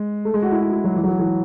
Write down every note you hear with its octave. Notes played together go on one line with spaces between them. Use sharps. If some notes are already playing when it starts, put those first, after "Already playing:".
Already playing: G#3
A3
G#3
F#4
E4
F#4
E4
F#3
E3
F#3
E3
E3